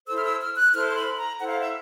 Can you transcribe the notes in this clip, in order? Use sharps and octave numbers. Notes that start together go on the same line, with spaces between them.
E4 A4 C5 E6
F6
E6
F6
F#6
E4 A4 C5 F6
C6
B5
A#5
E4 A4 C5 F#5
F5
E5